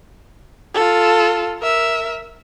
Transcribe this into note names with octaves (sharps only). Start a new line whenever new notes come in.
F4 A4
A#4 E5